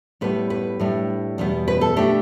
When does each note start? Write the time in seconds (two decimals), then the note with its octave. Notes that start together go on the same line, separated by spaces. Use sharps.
0.21 A2 G3 B3 B4
0.50 B4
0.80 A2 G3 D4
1.38 E2 B2 G3 B3
1.68 B4
1.81 A4
1.96 B2 A3 D4 G4